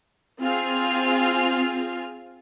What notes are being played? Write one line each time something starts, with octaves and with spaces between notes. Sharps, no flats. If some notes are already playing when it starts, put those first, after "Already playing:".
C4 F4 G#4 F6